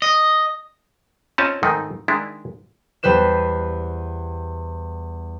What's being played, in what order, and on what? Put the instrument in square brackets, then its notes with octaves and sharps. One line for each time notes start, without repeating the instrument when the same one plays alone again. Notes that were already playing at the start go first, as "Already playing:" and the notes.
[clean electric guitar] D#5
[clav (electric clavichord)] C4 C#4 F4 C#5 D#5 A5
G#2 D#3 A3 C4 D#4
D#3 G#3 D4 E4
[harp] E2 G3 B4 C5 E7